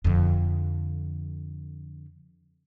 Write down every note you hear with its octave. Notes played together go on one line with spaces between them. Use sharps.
F2 D3